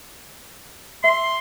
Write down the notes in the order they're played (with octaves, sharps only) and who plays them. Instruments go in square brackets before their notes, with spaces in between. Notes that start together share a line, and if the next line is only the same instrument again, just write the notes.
[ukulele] E5 [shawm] C6